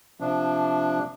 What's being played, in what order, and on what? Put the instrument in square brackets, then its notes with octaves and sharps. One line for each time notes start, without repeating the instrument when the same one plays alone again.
[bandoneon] C3 F3 D4